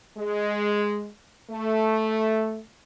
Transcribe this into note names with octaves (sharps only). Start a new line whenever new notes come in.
G#3
A3